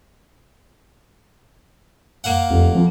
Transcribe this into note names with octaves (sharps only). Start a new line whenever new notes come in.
A#3 F5 F#5
F1 F2
F2 F3